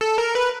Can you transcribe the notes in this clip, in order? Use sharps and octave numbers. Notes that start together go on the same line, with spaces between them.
A4
A#4
B4